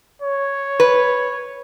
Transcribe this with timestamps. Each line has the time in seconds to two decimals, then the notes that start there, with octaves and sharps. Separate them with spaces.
0.22 C#5
0.80 B4